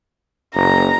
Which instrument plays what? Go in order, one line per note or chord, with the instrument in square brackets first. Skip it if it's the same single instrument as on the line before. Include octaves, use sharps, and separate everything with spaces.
[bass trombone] F#1 [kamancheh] A#5